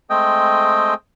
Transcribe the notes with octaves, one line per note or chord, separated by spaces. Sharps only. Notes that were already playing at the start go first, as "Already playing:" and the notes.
G#3 A3 C4 G#4 D#5 G5